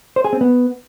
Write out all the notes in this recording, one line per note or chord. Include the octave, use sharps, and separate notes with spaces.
C5
G#4
C4
B3